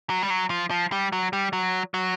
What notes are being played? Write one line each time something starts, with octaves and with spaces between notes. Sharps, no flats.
F#3
G3
F#3
F3
F3
G3
F#3
G3
F#3
F#3